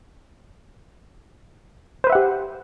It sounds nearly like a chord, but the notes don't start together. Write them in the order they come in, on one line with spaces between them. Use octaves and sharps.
C5 B4 E5 F#5 G4